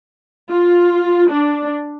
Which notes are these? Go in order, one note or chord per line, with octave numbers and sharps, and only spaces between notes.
F4
D4